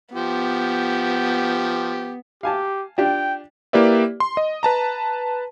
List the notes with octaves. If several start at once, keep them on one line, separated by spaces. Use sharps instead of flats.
F3 B3 G4
G4 F5 G#5 A5
D4 F4 G4 G5
A#3 E4 G4 B4 D5 E5
C6
D#5
B4 A5 A#5